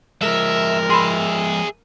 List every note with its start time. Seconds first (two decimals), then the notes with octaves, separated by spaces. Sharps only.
0.22 F3 G#3 A#4 E5
0.90 G#4 E5 B5 C6